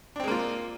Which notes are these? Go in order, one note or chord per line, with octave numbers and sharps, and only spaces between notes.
G#3 A#3 C4 D4 F4